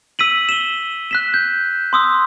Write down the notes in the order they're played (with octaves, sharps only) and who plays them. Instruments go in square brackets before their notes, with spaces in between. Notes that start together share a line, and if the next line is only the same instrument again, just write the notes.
[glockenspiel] E6 B6 D#7 F#7
E7 G7
F#6 B6 E7
G6
C6 D#6 E6